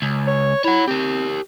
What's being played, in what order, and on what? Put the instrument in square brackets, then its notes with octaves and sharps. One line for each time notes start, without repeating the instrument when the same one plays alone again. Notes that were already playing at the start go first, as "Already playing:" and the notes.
[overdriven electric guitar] C#2
[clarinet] C#5
[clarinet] E4 [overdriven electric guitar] C#5 F#5
[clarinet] C4 [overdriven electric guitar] G4 A#4